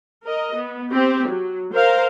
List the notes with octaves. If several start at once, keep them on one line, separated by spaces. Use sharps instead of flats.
A#4 D#5
B3
C4 G4
F#3
A#4 C5 F5